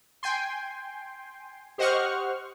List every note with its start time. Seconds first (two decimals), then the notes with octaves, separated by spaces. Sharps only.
0.23 G5 G#5 C6
1.78 G4 C5 D#5 F#5 C#6 F6